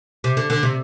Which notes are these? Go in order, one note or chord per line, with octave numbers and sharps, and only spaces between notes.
C3
D3
D3
C3